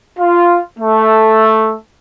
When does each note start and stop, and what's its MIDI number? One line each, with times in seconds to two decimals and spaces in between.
0.19 0.58 65
0.79 1.73 57